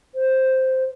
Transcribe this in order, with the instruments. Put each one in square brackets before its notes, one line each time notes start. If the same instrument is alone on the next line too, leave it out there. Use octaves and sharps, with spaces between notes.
[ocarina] C5